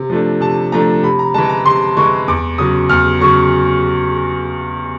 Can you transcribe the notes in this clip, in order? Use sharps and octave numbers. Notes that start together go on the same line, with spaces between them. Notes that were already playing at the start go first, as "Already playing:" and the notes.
Already playing: C3
F3 A3 D4
C3 A5
F3 A3 D4 A#5
C3 B5
A#5
E3 G#3 A5
A#5
C3 C6
E3 G#3 C#6
E2 D6
C#3 F#3 D#6
E2 F6
C#3 F#3 C#6